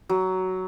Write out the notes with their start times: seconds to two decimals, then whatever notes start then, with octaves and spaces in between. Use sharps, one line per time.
0.09 F#3